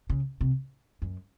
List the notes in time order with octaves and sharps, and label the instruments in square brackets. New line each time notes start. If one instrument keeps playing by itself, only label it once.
[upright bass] C#3
C3
F#2